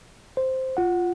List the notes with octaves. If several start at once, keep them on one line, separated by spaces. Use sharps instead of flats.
C5
F4 F#5